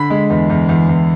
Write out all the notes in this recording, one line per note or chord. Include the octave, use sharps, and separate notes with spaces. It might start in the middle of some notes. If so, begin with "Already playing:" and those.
Already playing: D3 B5 B6
G#3
E2
E2
E2
E2